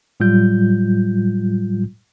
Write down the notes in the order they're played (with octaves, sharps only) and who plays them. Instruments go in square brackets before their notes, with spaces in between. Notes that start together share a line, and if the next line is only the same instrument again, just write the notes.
[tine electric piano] A2 F#3 G3 F4 G6